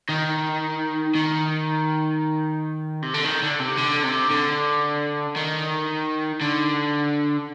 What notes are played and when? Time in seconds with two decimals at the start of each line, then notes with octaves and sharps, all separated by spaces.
0.09 D#3
1.15 D#3
3.02 C3
3.14 D3
3.25 D#3
3.43 D3
3.60 C3
3.78 D3
4.04 C3
4.31 D3
5.36 D#3
6.41 D3